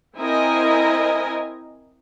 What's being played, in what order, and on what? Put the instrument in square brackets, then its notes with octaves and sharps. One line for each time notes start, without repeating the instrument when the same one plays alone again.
[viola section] C4 E4 A#4 D#5 G#5 A#5